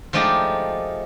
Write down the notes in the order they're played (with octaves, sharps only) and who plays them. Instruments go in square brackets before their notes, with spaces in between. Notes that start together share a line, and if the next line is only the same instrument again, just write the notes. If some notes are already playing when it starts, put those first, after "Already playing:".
[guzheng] F3 G#3 A3 D#4 G4 D5